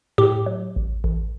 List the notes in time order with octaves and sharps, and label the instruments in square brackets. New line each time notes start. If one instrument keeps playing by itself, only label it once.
[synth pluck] A2 G4
F#3
A1
A1